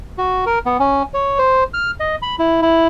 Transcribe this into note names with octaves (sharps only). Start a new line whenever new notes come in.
F#4
A#4
B3
C#4
C#5
C5
F6
D#5
B5
E4
E4